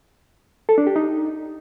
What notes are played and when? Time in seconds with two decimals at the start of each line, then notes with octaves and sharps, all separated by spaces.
0.69 A4
0.78 D4
0.87 G4
0.96 D#4